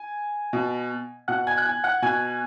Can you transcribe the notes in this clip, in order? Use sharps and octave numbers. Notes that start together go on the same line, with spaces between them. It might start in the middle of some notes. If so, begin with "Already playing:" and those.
Already playing: G#5
B2
B2 F#5 F#6
G#5 G#6
F#6
G#5 G#6
F#5 F#6
B2 G#5 G#6